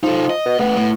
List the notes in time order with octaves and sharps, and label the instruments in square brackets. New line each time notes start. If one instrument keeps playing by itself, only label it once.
[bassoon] F3 [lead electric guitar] D#4 A4
[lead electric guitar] D#5
[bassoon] B2
[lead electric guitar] A3 B4 [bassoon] B3
[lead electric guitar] A2